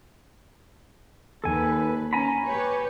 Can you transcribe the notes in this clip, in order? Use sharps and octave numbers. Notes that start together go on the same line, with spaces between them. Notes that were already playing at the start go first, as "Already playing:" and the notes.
D#2 A4 B4 G#5
C#4 G#5 A#5 B5
G4 B4 C#5